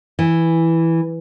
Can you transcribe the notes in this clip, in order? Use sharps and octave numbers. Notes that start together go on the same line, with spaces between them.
E3